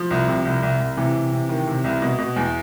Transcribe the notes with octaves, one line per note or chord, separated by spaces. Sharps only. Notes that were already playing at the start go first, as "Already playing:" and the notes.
Already playing: F3
C2
C3
C2
C2
C2
C3 E3
C3
C3
D#3
C3
C2
B2
B2
E2